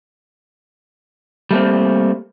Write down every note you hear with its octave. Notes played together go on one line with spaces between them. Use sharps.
G3 A3 A#3 C4